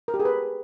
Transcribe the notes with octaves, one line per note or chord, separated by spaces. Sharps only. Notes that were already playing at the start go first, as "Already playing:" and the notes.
A#4
G4
G#4
B4